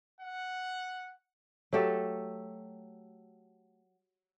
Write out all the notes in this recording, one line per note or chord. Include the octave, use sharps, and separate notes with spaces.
F#5
F#3 A3 G4 A4